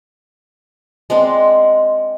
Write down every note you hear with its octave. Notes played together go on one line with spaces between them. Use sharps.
G#3 C4 D4